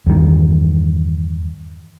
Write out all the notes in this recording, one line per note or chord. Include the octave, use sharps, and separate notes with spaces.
E2 G2 D#3